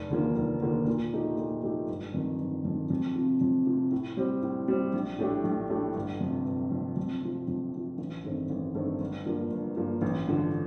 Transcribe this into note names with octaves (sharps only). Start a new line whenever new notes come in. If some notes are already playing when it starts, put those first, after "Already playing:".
Already playing: F1
D#2 D3 F3 A#3
F1
D#2 D3 F3 A#3
A#2
F3 A3 D#4 G4
A#2
F3 A3 D#4 G4
G1
F2 D#3
G1
F2 D#3
F2
C3 F3
F2
C3 F3
A2
G3 C4
A2
G3 C4
A#1
A2 A3 D4 G4
A#1
A2 A3 D4 G4
G1
F2 C3
G1
F2 C3
F2
C3 F3
F2
C3 F3
A1
G2 D#3 A3 C4
A1
G2 D#3 A3 C4
G1
G2 F3 A#3
G1
G2 F3 A#3
A1
G2 D3 F3